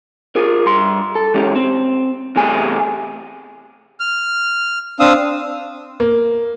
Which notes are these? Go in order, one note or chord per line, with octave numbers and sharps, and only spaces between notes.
F4 G#4 A#4
G2 C6
A4
E3 G#3 C#4 G4
C4
E2 C3 A3 G4 G#4 G#5
F6
C4 D4 F5 D#6 E6
A#3